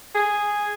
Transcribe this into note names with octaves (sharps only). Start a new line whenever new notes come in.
G#4